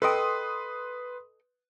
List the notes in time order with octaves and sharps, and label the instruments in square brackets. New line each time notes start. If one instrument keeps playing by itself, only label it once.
[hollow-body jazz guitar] A4 D#5 G5 [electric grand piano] B4 C6 D#6